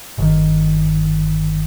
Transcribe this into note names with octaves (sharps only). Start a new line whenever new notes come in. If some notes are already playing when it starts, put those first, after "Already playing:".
G1 D#3